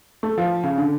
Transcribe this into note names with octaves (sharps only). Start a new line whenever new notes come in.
A3
F3
C#3
D3